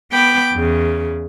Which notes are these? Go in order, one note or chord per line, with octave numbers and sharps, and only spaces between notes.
B3 G5 B5 D6
E2 C#3